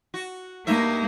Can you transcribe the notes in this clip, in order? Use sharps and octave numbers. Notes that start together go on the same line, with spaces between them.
F#4
G2 A#3 D#4 E5